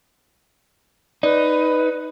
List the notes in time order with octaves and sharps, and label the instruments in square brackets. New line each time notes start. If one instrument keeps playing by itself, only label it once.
[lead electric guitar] D#4 [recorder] B4 [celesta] D5